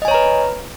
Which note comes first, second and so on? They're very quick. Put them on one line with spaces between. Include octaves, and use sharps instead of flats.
D#5 G#5 C#5 A#5 B4